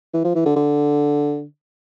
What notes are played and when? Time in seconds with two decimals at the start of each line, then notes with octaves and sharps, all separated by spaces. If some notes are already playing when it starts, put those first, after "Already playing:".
0.14 E3
0.25 F3
0.35 E3
0.46 D3
0.56 D3